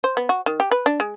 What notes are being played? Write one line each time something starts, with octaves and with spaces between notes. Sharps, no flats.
C5
B3
F#4
D#3
G4
B4
D4
G#3